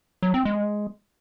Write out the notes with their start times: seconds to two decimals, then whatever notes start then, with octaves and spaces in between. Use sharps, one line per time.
0.23 F#3
0.34 C4
0.45 G#3